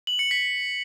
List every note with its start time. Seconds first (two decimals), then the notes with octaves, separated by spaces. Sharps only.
0.07 F#7
0.19 C#7
0.31 B6